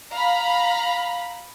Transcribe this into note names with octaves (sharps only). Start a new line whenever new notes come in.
F5 A#5 B5